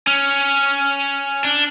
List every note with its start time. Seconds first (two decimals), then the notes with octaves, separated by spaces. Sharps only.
0.07 C#4
1.44 D4